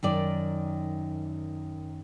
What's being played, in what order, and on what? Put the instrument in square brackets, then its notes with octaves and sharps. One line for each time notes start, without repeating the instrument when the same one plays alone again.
[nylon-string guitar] F#2 D#3 D5